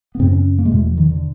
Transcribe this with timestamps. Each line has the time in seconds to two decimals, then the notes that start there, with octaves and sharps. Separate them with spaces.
0.15 B3
0.19 F#2 C#3 C4
0.32 C#4
0.58 A#3
0.65 G#3
0.71 E2 B2 A3
0.85 F3
0.97 D#3
1.11 D3